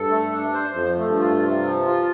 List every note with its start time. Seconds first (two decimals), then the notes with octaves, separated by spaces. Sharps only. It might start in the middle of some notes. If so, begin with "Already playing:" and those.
Already playing: G2 A4
0.11 A3
0.32 D4
0.54 C5
0.75 F2 F3
0.98 A3
1.08 G2
1.20 F4
1.42 C3
1.63 F3
1.85 F4